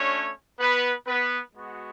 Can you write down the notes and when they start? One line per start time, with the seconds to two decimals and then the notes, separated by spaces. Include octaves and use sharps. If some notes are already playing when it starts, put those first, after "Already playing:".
Already playing: A3 C#4 D4 F#4 C#5
0.59 B3 B4
1.07 B3 B4
1.55 G#3 B3 F#4